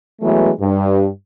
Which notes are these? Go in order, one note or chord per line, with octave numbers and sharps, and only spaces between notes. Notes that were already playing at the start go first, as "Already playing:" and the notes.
E3 F#3 G#3 A3 B3
G2